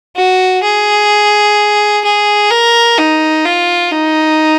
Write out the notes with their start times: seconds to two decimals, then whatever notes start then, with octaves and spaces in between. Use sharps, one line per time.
0.16 F#4
0.64 G#4
2.05 G#4
2.51 A#4
2.98 D#4
3.45 F4
3.92 D#4